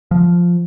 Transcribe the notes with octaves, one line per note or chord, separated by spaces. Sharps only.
F3